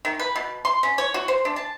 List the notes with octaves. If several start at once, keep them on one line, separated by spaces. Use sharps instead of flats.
D#3
B4
B2
C6
C#4
C#5
F#4
C5
D4
A5